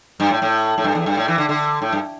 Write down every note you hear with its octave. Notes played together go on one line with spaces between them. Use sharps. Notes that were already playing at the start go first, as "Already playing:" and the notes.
G2
A2
A2
A2
G2
E2
G2
A2
E3
D3
D3
A2
G2